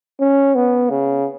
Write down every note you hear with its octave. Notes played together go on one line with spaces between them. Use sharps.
C#4
B3
C#3